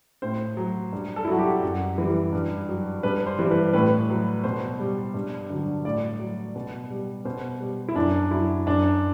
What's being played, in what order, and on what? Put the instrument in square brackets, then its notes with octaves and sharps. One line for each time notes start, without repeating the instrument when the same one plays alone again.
[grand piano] A2 C5
F#3
G2
A4
E4
F#3 F#4
G4
F#2 F#4
E3 G3
G2
F#3
G2 B4
C5
E3 G3
B4
A2 B4
F#3
B2 C5
G3
G2
D3 F#3
A2 D5
F#3
B2
G3
B2 C5
G3
E4
F#2 D4
F#3 E4
F#2 D4